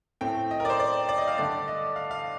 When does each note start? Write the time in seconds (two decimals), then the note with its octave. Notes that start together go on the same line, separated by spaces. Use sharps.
0.21 A2 A3 C4 G5
0.51 D#5
0.60 A#4
0.65 D5
0.70 C5
0.80 D5
1.09 D5
1.18 D#5
1.28 F5
1.38 G2 D3 A3 D5
1.68 D#5
1.96 F5
2.11 F5